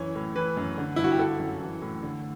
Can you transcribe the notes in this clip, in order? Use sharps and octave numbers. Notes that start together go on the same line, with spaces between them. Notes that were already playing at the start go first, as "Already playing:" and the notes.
Already playing: F#2 E3 C#5
A2
E3 B4
F#2
D3
G2 E4
F#4
G4
D3 A4
F#2
E3
A2
D3